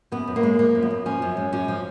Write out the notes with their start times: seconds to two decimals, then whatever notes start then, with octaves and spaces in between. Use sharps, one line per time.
0.12 F#2 B3
0.27 F#2
0.36 A#3
0.43 G#3
0.59 F3 A#3
0.75 F#2
0.82 B3
0.91 F#2
1.06 F3 C#4
1.22 F#2
1.37 G#3
1.53 F#2 C#4
1.68 F3